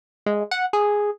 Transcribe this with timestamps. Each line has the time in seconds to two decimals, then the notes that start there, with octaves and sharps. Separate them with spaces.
0.26 G#3
0.51 F#5
0.73 G#4